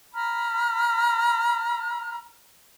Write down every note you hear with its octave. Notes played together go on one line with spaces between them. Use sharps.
A#5 B5 F6